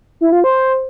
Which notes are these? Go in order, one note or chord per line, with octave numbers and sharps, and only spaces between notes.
E4
F4
C5